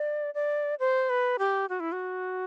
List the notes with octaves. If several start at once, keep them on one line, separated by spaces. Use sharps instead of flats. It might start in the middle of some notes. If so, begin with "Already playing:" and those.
Already playing: D5
D5
C5
B4
G4
F#4
E4
F#4